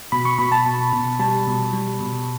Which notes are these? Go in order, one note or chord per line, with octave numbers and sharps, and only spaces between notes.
B2 B5
C#6
B2 B5
A5
B2
B2
G3 A5
B2
G3
B2